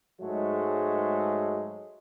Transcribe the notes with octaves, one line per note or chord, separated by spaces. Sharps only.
G#2 F#3 G#3 A3